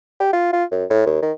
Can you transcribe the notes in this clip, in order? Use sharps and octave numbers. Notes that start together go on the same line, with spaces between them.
G4
F4
F4
F#2
A2
D#2
D#3